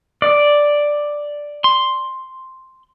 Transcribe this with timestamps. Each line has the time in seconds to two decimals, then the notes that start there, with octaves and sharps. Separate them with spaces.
0.22 D5
1.64 C6